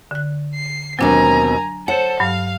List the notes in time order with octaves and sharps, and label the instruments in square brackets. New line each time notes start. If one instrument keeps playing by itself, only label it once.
[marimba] D3 F#6
[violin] C7
[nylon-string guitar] D#2 B2 C4 [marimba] F#3 D4 [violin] G#5 A#5
[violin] A4 C5 [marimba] C#5 [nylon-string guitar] F#5
[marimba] G2 F#3 [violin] F5